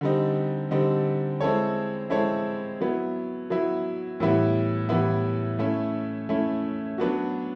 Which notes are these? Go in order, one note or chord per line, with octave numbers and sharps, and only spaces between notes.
D3 G3 C4 D#4
D3 G3 C4 D#4
G#3 C4 E4 A4 C#5
G#3 C4 E4 A4 C#5
F#3 B3 E4
F#3 B3 E4
A2 E3 G3 B3 E4
A2 E3 G3 B3 E4
A3 C#4 E4
A3 C#4 E4
F#3 B3 D4 F#4